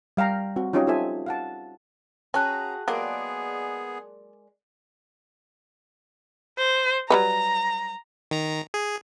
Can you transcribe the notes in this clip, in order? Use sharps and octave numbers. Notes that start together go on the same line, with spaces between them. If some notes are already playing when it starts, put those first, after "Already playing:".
G3 F5 G5 A#5
C4 F#4
C#4 D#4 F4 G4 C#5 D#5
D#4 F4 A4 C5 E5 G#5
F5 F#5 A5
C#4 F#4 G#4 B4 G5 A5 A#5 F#6
F#3 G#3 A#3 B3 G4 G#4 A#4 D5
C5
F#3 G3 B4 A#5
D#3 A#5
G#4